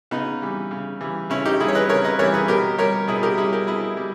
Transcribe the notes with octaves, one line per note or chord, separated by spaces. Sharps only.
C#3 B3 D#4
E3 G3
C#3
E3 G3
C#3 C#4 E4
D#4 G4
E3 G3 E4 G#4
C#5
B4 D#5
C#3 A#4 C#5
B4 D#5
E3 G3 A#4 C#5
G#4 B4
B2 G4 A#4
G3 A#4 C#5
B2 E4 G#4
G4 A#4
G3 E4 G#4
G4 A#4
B2 E4 G#4
G3